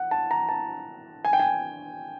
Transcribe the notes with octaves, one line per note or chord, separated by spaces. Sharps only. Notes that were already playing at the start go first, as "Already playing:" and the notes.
Already playing: F#5
A5
A#5
A5
G#5
G5
G#5